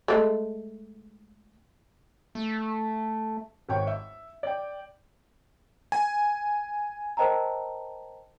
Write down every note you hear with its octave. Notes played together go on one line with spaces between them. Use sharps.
G#3 A3
A3
G#1 C#5 G5 C#6
E5
D5 G5
G#5
A#4 C5 D#5 G5 A5 A#5